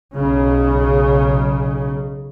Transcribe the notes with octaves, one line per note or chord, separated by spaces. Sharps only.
B1 C#3